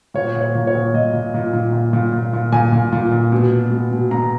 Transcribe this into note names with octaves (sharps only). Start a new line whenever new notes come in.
A#2 C#5
A#2
C#5
A#2
C#5
A#2
A#2 D#5
A#2
A#2
A#2
A#2
A#2
A#2
A#2
A#2 G#5
A#2
A#2
A#2
B2
B2
B2
B2
B2 A#5